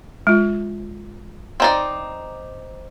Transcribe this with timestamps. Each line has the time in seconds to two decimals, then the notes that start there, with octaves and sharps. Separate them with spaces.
0.27 G#3 F4
1.60 C4 D#4 D5